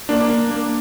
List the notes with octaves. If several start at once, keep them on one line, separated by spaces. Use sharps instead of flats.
A#3 D4
A#3
A#3